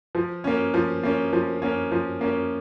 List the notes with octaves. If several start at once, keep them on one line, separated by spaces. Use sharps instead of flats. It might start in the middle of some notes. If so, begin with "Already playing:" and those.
F3
A#3 C#4
F3
A#3 C#4
F3
A#3 C#4
F3
A#3 C#4